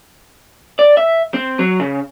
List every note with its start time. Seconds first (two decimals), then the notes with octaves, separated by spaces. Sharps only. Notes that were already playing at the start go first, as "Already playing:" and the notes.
0.79 D5
0.97 E5
1.34 C4
1.59 F#3
1.80 C#3